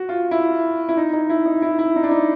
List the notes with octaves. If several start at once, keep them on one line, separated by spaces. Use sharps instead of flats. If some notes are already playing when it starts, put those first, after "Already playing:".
Already playing: F#4
F4
E4
E4
D#4
D#4
E4
D#4
E4
E4
D#4
D4
D#4